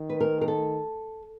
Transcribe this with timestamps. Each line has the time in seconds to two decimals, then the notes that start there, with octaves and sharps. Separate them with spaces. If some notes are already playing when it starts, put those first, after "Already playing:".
Already playing: D#3
0.09 B4
0.20 A#4
0.41 A#4
0.48 A4